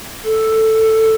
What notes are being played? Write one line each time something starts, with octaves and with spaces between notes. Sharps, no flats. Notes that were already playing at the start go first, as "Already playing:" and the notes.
A4